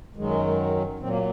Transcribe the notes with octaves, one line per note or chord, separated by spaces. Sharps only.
F#2 D#3 F#3 G#3
A#2 F#3 C4
A#3